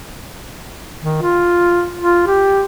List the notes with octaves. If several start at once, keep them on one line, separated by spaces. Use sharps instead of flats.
D#3
F4
F4
G4